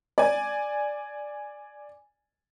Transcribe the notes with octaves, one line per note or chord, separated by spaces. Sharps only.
D5 G#5